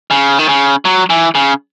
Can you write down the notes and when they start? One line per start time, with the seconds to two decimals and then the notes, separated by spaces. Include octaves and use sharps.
0.11 C#3
0.39 D#3
0.49 C#3
0.85 F#3
1.10 E3
1.35 C#3